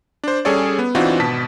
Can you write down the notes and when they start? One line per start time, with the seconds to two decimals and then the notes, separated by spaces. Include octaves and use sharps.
0.24 D4 C5
0.45 G3 C#4 G#4 A4 C#5 D5
0.79 B3
0.95 E3 C4 D4 D#4 F4 F#4
1.20 G#1 B2 A5 B6